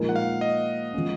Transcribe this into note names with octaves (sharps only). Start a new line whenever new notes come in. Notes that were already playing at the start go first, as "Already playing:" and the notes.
Already playing: A#2 F3 G#3 D#4 A#4
F#5
F5
D#5
F3 G#3 C#4